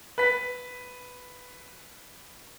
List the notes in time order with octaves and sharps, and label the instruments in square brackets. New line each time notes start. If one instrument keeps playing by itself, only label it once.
[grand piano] B4 B6